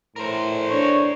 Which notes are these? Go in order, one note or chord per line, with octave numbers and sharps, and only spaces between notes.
A2 A#4 C5
D4 C#5